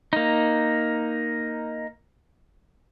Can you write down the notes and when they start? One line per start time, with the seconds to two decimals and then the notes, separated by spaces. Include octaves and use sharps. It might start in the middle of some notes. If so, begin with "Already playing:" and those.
0.13 A#3 D#4